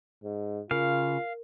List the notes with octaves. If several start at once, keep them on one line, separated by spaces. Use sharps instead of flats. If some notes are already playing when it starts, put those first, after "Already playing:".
G#2
C#3 F4 A#4 F5